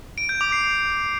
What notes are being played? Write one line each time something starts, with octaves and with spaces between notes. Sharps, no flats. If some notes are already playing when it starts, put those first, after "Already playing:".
D7
G6
D6
C7